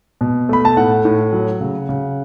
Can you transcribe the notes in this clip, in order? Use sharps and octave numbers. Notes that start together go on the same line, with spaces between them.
B2
A3 B5
A5
A2 F#5
A2
F#3
C#3
C#3